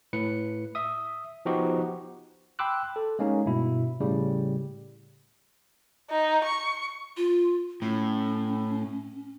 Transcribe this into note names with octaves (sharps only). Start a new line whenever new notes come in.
A2 B4 C#7
E5 D#6
F3 B3 D#4 F#4 G4 C5
G5 B5 C6 D6 E6 F#6
A4
G#3 A#3 C#4 D#4
G2 B2 E4
A2 C#3 G3
D#4
C#6
F4
A2 C#4